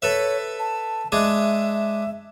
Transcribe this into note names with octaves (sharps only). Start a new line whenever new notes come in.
A4 B4 C#5 E5
A5
G#3 D4 G#4 E5